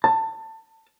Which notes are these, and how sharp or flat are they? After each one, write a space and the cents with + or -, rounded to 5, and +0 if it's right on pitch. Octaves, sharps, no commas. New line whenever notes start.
A5 +25